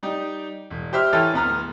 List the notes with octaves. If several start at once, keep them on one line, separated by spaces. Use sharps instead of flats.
G3 D#4 G4
E1
G4 C5 E5 D6 F6
E3 A4 C#5 G5 F6 A6
D1 B3 A#5 F6